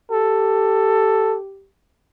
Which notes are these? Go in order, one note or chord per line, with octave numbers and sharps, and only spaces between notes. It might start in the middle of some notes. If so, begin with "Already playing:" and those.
G4 A4